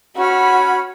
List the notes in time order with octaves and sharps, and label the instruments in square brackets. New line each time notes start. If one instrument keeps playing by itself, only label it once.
[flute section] C#4 B5 F6 [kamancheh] F#4